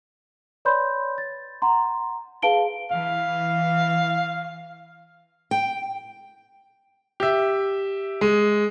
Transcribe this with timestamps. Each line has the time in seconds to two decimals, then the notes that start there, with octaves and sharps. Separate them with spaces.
0.65 B4 C#5 D5 B5 C6 G6
1.18 A6
1.62 F#5 A#5 C6
2.42 G#4 B4 F5 A5 D7 G7
2.91 E3 F5
5.51 G5
7.20 G4 E5
8.21 G#3